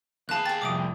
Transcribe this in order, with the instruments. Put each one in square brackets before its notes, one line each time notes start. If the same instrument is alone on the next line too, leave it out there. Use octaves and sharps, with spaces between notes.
[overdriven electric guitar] D#2 F5 [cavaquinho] G#4 B4 [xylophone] A5 F#6
[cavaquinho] G4 G#4 [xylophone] A6
[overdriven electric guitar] C2 F2 [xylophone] D6 D#6 D7